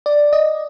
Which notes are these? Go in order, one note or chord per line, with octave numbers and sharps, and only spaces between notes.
D5
D#5